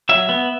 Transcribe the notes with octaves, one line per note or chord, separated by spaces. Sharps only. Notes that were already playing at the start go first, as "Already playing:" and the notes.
F#3 E5
B3